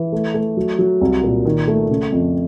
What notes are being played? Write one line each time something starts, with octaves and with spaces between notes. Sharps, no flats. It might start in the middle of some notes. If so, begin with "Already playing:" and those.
Already playing: E3
A3
A3
F#3
F#3
C2
A#2
D#3
A3
C#3
F2